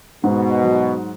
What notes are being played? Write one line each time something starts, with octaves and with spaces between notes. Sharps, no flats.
G#2 B2
F#3